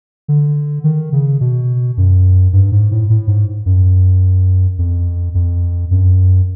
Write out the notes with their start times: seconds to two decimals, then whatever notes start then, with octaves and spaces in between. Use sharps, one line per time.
0.28 D3
0.84 D#3
1.13 C#3
1.41 B2
1.97 F#2
2.53 G2
2.72 G#2
2.91 A2
3.10 A2
3.28 G#2
3.66 F#2
4.78 F2
5.35 F2
5.91 F#2